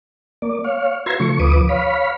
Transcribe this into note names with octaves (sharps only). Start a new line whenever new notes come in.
A#3 D5
C#5 F5
F#4 B4 E5 A#5 C6 G#6
C#3 F3 A3 C#6
D2 F3 B4 D6 D#6
C#5 F5 B5